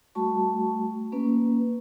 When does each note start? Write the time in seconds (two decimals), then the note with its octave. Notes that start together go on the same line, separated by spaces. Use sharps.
0.15 G3 A3 F#4 A5 C#6
1.12 A#3 C#4 B4